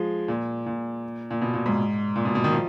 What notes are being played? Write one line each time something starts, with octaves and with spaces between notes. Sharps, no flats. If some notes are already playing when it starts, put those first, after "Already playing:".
Already playing: F3 G#3
A#2
A#2
A#2
B2
A#2
G#2
A#2
B2
B2
D#3
F3